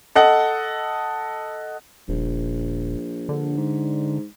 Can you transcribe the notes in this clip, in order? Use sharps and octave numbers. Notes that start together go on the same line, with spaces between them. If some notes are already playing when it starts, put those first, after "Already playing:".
A4 D#5 F#5
D#1 A#1
D3
G#2